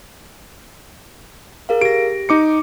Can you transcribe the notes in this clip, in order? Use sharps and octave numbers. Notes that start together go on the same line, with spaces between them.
G#4 A#4 F5
G4 A#6 D7
D#4 D6 C#7